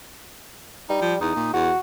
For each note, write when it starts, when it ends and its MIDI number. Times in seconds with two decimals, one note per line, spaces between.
0.89 1.20 55
0.89 1.01 63
1.02 1.15 53
1.21 1.34 40
1.21 1.50 63
1.36 1.50 46
1.53 1.71 40
1.53 1.79 66